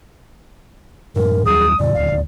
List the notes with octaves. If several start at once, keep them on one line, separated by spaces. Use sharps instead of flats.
F#2 A2 A#4
D#2 F#3 G3 G#4 D#6
F2 A2 C#3 D5
D#1 D2 F5